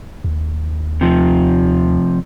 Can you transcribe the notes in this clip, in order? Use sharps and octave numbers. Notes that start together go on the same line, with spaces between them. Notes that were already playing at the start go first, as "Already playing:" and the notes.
D#2
C3 F3